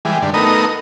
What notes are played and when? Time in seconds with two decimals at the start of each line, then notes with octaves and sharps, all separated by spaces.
0.05 E3 G3 G#3
0.22 G2 D3
0.34 A3 B3 D#4 A#4 D#6